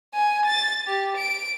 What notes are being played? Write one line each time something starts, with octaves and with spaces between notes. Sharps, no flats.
G#5
A6
G4
D7